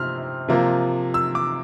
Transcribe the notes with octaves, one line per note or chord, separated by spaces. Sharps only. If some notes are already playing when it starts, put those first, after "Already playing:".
Already playing: C3 F3 C4 C6 F6
C3 F3 A#3
E6
D6